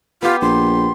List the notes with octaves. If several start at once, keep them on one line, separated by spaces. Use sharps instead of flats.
B3 F4 G4
A#1 C6